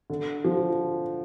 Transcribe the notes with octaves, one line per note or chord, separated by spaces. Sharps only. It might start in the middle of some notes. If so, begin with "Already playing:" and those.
D3
F3